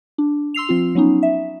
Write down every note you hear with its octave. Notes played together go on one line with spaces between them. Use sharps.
D4
C6 E6 C7 F7
F3 C4 F4
F#3 B3 C#4 D#4
E5